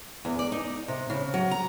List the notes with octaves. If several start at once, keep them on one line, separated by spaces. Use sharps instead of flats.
E2
D5
D#4
C3
C#3
F#3
A#5